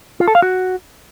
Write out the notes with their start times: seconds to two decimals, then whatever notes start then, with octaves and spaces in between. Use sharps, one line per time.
0.20 F4
0.28 A4
0.35 F5
0.42 F#4